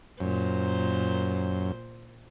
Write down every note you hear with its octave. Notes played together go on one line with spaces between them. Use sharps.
F#2 A#2 C5